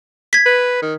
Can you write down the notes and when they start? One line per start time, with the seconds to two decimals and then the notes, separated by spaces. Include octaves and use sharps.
0.33 G#6 B6
0.46 B4
0.82 D#3